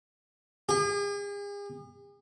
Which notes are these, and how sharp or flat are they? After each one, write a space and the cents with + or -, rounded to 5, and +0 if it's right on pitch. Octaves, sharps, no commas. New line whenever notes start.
G#4 -45